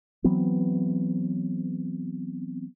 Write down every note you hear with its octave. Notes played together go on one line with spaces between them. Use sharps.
E3 F#3 B3 C4